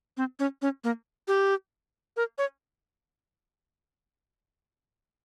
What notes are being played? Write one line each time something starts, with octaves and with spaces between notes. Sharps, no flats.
C4
C#4
C#4
A#3
G4
A#4
C#5